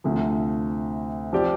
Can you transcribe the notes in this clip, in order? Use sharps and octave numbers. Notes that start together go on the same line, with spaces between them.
D2 C3 F3
F3 C4 G4 D5